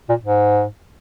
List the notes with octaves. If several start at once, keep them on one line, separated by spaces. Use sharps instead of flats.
A#2
G#2